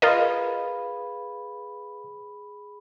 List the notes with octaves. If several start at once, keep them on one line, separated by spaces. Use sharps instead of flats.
F4 G#4 A#4 B4 D#5 F5 B5